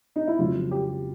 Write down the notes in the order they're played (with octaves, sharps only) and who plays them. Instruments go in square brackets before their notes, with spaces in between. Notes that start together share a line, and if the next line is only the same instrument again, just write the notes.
[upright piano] D#4
E4
F2 C#3 F#3 F4
G4